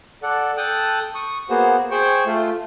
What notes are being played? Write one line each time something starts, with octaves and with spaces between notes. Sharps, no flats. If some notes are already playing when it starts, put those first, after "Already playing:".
A4 D5 F#5
A4 G5 A5 D#6 F#6
C#6 D#6
A#3 B3 F#4 G#4 C5
G#4 C5 G5 C#6
A3 F4